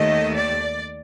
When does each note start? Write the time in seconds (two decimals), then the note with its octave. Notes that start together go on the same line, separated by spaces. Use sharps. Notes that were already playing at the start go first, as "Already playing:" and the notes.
Already playing: D#2 D#3 A3 D#5
0.35 D5